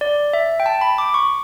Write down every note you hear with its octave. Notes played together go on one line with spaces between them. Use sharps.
D5
E5
G5
A5
B5
D6
C#6